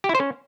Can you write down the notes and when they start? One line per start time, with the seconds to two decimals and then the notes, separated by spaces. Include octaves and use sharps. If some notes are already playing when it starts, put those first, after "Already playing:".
0.04 G4
0.09 E4
0.15 C5
0.20 C#4